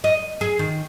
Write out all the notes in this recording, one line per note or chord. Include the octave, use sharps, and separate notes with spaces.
D#5
G#4
D#3